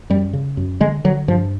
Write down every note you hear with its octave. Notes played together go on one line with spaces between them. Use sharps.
F#2 G3
C#3
F#2
D3 G#3
D3 F#3
G2 F3